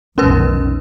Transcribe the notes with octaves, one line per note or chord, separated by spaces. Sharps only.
F1 B1 D#3 C#4 A#4 B4